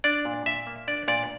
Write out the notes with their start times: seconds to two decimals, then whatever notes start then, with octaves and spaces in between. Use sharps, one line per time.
0.04 D4 D5
0.25 A#2
0.46 A#2 E5
0.67 A#3
0.88 D4 D5
1.08 A#2 D5